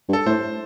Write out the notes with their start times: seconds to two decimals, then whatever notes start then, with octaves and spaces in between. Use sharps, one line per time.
0.09 G2
0.13 A4
0.27 A2 C5